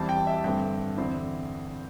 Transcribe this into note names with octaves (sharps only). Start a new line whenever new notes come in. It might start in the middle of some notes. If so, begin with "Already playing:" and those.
Already playing: E2 E3 G3 C4 E4 A5
G5
E5
G2 D3 A3 C4 G5
E2 D3 C4 E4